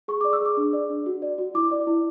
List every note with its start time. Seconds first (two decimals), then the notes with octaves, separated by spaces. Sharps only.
0.08 G#4 C#6
0.21 D6
0.24 D5
0.33 E6
0.41 G#4 D6
0.57 D4
0.73 D5
0.90 D4
1.06 F#4
1.22 D5
1.38 F#4
1.54 E4 D6
1.71 D5
1.87 E4